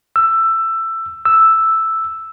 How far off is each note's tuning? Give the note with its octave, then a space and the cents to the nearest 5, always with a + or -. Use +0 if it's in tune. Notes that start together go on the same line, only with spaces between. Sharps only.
E6 +15
E6 +0